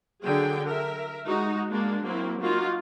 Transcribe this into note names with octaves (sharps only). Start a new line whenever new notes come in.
D3 F#3 G#4 G5
A#4 E5
G#3 D#4 F#4
G#3 A#3 D4
F#3 A#3 C4 E4
A#3 D#4 F4 F#4